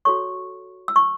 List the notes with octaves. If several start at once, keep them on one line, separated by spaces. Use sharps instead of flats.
F#4 A4 C#5 C#6
E6
C#6